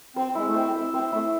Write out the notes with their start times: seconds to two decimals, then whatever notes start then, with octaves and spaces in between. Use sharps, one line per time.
0.16 C4 C5
0.35 G#3 E4
0.46 A3
0.54 C4 C5
0.74 E5
0.93 C4 C5
1.12 A3 E4